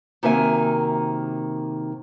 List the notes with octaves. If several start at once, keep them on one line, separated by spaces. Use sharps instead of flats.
C3 D#3 A#3 F#4 E5 G#5